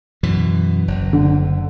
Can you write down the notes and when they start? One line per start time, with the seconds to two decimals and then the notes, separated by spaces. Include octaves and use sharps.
0.23 F#2 B2 E3
0.88 F#1
1.13 D3